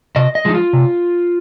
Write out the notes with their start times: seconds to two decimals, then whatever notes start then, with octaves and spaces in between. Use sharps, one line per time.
0.16 C3 D#5
0.35 D#5
0.45 F3 G#3 D#4
0.55 F4
0.73 C3